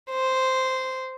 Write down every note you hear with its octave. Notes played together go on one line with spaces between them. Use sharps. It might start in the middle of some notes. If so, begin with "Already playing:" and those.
C5